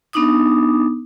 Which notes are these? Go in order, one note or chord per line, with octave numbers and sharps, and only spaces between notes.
B3 D4 D#4 D6 D#6